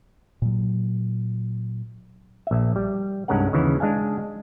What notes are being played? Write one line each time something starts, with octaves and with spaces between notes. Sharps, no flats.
A#2 F#3
A#1 E5
G3
C2 G2 G#3 C#4 A#4 F#5
D#2 C#3 E3 E4
G#3 D4 F5 G#5